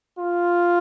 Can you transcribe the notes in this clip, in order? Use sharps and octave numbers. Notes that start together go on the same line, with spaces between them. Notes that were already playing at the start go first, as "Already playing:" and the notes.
F4